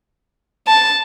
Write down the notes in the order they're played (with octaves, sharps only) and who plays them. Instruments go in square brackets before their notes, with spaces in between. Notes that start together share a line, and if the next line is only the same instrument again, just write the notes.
[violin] A5